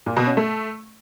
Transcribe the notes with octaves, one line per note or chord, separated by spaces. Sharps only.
A#2
B2
C#4
A3